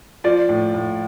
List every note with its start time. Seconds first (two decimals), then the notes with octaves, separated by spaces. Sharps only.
0.24 F3 D5
0.49 A2
0.74 A2